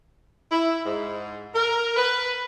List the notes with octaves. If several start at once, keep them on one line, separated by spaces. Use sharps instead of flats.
E4
G#2
A#4
B4